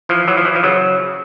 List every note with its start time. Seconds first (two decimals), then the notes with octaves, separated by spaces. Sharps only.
0.09 E3 F3
0.28 E3 F#3
0.37 F3
0.45 E3
0.55 F3
0.63 C#3 F#3